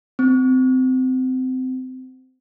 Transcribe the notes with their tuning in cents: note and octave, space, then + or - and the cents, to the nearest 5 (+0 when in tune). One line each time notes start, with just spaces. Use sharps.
C4 -20